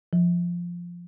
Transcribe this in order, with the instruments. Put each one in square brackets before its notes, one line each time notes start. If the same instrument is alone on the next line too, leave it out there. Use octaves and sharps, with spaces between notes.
[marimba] F3